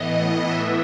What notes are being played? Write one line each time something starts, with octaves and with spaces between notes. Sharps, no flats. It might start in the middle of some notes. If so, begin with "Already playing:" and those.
Already playing: A2 E3 B3 D#5
E5